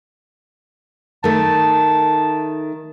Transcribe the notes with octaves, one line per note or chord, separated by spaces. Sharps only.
D#3 A3 A5